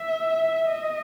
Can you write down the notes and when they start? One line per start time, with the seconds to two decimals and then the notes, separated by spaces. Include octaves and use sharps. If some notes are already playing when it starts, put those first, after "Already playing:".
Already playing: E5
0.68 D#5